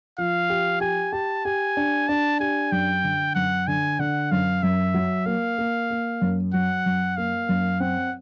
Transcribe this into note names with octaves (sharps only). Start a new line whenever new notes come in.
F3 F5
G4
G4 G#5
G4 A5
G4 G#5
D4
D4 A5
G4 G#5
F#2 G5
D3
F#2 F#5
D3 G#5
D3 F#5
F#2 F5
F#2 E5
F#3
A#3 F5
A#3
A#3
F#2
F#3 F#5
F#2
A#3 F5
F#2
C4 F#5